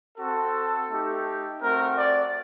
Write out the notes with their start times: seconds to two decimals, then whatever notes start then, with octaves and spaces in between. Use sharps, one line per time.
0.18 C4 F#4 A4
0.90 A3 D#4 G4
1.62 A3 C4 F#4 A#4
1.98 D5